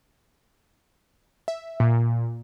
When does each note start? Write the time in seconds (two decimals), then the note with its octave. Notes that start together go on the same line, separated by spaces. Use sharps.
1.48 E5
1.80 A#2